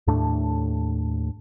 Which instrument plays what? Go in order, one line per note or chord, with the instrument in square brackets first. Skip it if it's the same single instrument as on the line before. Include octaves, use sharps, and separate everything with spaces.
[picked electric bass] D#2 A2 A3 D4